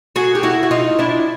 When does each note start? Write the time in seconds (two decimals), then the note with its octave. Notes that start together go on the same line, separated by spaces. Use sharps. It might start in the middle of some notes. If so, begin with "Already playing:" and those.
0.16 F#4 G#4
0.35 G4
0.43 E4 F#4
0.63 F#4
0.71 D#4 F4
0.99 D4 E4